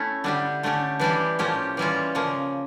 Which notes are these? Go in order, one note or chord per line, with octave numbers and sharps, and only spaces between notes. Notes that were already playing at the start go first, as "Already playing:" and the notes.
Already playing: A3 C#4 E4
D3 G3 D4 G4
D3 A3 C#4 G4
E3 G3 D4 G4
A2 F3 A#3 C#4 G4
E3 G3 C#4 F4
C#3 F3 A#3